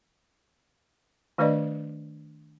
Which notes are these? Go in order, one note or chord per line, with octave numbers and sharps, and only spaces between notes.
D#3 A3 D4 B4 D5 D#5